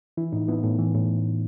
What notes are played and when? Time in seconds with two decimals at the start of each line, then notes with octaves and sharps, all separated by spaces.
0.17 E3 E4
0.33 A2 D#4
0.48 B3 E4
0.63 A2
0.79 E3
0.95 A2